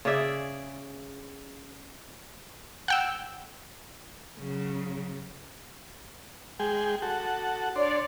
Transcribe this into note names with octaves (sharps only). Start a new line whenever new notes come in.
C#3 G#4 D5 E5
F#5 G5 E6
C#3 F#3
G#3 G#4 G5
F#4 A4
D4 C#5 D5 C6